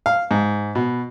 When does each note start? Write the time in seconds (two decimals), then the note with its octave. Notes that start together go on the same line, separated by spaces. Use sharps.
0.06 F5
0.31 G#2
0.75 B2